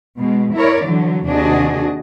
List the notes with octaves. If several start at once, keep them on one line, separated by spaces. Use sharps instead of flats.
B2 G#3
E4 A#4 C#5 D5
D3 E3 F#3
D#2 C3 D4 F#4 G#4 D#5